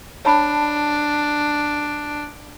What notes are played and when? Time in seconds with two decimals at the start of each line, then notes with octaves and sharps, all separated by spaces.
0.25 D4 C#5 A5 B5